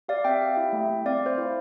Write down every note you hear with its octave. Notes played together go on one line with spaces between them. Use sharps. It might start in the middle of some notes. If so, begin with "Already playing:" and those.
G4 D5 F5
C4 E5 G5
G4
E4
A3
A3
C4 D5 F5
A3 C5
E4